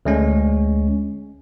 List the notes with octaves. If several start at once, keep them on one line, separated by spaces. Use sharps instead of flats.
D2 G#3 C#4